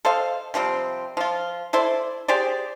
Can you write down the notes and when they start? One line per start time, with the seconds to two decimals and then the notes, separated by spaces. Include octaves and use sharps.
0.05 A4 C5 D#5 F5
0.54 C3 F3 G3 C4
1.17 F3 F4
1.73 E4 A4 C5 D5
2.28 G4 G#4 C5 D5